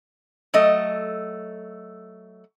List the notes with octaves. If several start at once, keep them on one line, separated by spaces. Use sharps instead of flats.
F#3 A3 D#5